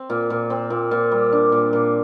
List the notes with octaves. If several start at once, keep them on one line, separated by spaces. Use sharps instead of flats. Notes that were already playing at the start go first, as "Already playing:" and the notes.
Already playing: C4
A#2
A#2
C4
A#2
A#2
G3
D4
A#2
A#2